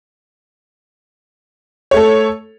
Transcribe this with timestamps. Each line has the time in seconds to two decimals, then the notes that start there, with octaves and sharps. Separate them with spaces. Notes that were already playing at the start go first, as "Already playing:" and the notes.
1.91 C#5
1.94 A3
1.97 A4